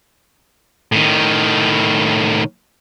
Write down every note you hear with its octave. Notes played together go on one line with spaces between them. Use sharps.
A2 D#3